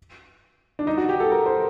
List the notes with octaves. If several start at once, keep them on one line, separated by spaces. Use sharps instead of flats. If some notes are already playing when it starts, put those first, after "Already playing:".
D4
D#4
F#4
G4
A4
A#4
C5